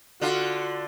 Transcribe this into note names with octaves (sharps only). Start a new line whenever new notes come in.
D3 F4 F#4